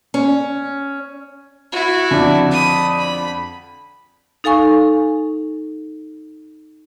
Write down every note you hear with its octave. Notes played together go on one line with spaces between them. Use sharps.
C#4
E4 F#4
F2 D3 D4
B5 D#6
B5
D#4 A4 F5 G#5 C#6